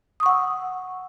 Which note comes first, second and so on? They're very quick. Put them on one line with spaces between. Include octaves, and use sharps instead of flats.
D#6 C#6 F#5 E6